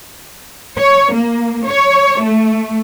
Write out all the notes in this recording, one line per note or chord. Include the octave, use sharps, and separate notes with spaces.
C#5
A#3
C#5
A3